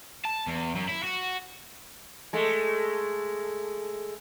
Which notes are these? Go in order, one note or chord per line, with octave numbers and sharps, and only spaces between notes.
A5
E2
F#2
E4
F#4
G#3 A3